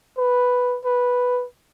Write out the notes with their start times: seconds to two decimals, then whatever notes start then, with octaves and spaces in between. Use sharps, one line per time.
0.18 B4
0.85 B4